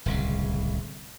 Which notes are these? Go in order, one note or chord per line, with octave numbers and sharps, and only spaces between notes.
D1 C2 C#3